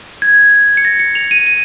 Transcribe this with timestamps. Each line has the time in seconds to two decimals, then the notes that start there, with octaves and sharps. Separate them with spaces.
0.22 G#6
0.77 C#7
0.85 A#6
1.00 C#7
1.15 F7
1.31 D#7
1.47 D#7